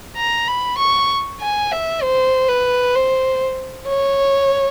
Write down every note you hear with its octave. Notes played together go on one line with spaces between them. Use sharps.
A#5
B5
C#6
G#5
E5
C5
B4
C5
C#5